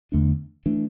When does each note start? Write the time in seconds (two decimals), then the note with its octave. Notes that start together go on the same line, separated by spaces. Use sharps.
0.12 E2 D3 A3 D4
0.66 E3 A3 D4